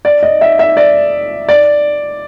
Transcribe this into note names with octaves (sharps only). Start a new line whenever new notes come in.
D5
D#5
E5
E5
D5
D5